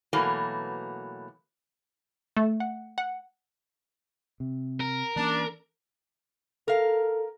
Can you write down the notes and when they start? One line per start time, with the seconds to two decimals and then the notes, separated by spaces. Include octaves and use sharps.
0.13 B2 E3 F#3 A3 A#3
2.37 A3
2.60 F#5
2.98 F#5
4.40 C3
4.80 A#4
5.16 E3 A#3 C#4 D4
6.68 A4 A#4 F5